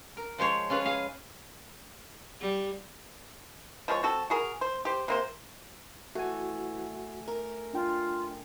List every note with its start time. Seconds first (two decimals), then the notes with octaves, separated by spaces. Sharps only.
0.17 A#4
0.38 F3 G#3 C5 C#5
0.70 C#4 F4 G#4 B4
0.86 G#4 F5
2.40 G3
3.88 F3 G#3 A#4 C#5
4.03 C4 F#4 A4
4.30 F#4 G#4 A#4
4.61 C5
4.85 G4 C5
5.08 C3 A#3 C5
6.15 E3 A3 F#4 F#5 G#5
7.28 A#4
7.73 D4 F4 G5